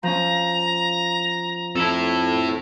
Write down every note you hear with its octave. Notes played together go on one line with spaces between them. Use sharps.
F3 C#4 A#5
F2 E4 A4